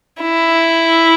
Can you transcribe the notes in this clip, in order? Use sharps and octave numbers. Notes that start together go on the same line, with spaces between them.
E4